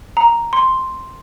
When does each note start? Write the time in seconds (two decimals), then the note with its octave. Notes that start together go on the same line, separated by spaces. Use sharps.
0.17 A#5
0.53 C6